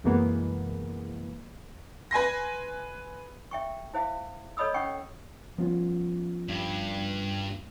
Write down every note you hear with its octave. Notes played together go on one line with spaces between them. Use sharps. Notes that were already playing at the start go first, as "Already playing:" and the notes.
C2 F#2 E3 G#3 A#3 B3
B4 G#5 C6 A#6
E5 G5 C#6
E4 C5 E5 F5
A4 C#5 D#5 B5 D#6 E6
C#4 F#5 G5 C#6
F3 G3 B3 C#4 F4
G2